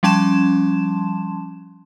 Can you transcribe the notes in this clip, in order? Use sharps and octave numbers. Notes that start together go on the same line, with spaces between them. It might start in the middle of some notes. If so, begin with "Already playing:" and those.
F3 G3 C#4 A5 C6 E7